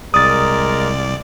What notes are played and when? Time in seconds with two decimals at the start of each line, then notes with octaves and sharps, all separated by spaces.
0.14 C2 G#3 A#4 D5 D#6 A6